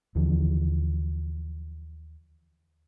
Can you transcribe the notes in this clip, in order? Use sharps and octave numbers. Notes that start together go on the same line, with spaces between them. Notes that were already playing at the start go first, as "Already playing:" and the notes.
D#2 D3 E3 F3